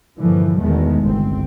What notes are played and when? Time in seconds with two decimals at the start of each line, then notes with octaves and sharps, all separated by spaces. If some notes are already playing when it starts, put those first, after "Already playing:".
0.18 G2 A#2 D3 E3 F3
0.61 E2 B2 D#3 G#3 A3 B3
1.02 G1 C2 C4